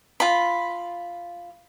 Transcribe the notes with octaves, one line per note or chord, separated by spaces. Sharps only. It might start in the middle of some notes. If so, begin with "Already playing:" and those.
F4 B5